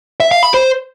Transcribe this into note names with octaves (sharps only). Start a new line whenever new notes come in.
E5
F5
B5
C5